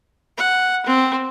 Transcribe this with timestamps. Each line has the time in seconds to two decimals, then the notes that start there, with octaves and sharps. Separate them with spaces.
0.37 F#5
0.86 C4